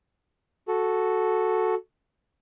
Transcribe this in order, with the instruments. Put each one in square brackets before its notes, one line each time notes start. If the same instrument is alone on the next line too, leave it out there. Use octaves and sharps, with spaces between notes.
[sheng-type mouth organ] F#4 A4